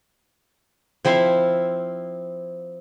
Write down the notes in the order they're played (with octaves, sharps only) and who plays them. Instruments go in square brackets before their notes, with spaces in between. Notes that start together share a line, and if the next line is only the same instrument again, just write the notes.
[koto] F3 C4 E4 E5 F5